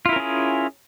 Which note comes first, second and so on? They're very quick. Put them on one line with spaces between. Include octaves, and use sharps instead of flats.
F4 E4 A#4 C#4 G#4